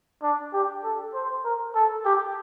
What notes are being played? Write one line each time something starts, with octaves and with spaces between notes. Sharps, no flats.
D4
G4
A4
C5
A#4
A4
G4